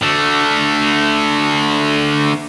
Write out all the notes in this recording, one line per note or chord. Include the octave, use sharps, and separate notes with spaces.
D3 A3